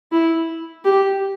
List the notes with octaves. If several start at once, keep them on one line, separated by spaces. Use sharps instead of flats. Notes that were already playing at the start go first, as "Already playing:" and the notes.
E4
G4